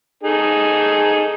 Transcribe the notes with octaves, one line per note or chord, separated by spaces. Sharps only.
D#4 G#4 A4